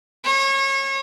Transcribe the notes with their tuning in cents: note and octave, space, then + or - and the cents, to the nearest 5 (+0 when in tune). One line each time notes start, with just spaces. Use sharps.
C#5 -30